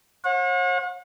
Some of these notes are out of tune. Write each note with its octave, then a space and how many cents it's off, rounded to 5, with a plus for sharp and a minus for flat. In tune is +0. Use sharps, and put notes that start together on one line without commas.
C#5 -45 F#5 -40